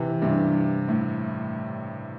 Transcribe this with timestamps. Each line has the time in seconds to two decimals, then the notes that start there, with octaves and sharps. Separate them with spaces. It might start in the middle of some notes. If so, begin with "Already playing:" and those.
Already playing: C3 E3
0.22 G2 C3
0.88 A2